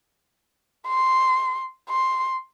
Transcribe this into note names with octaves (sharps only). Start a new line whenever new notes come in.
C6
C6